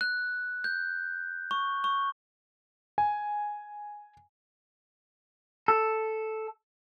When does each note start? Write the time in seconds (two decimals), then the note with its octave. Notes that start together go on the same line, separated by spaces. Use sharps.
0.01 F#6
0.64 G6
1.51 C#6
1.84 C#6
2.98 G#5
5.68 A4